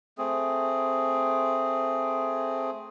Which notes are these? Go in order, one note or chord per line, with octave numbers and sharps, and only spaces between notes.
A3 C4 G#4